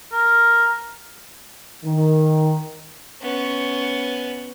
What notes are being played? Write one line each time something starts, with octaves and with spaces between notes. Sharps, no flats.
A#4
D#3
B3 C#4